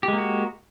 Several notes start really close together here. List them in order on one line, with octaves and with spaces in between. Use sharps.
G4 G#3 A#3 F#4